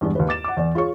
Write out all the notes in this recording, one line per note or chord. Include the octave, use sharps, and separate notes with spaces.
E2 G2 G#3 D4
D#2 D#3 B4
D6 A6 E7
F#5 D6
E2 D5
F4 G#4 C#5 C#6